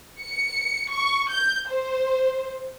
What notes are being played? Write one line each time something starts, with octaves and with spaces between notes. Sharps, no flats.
C#7
C#6
G6
C5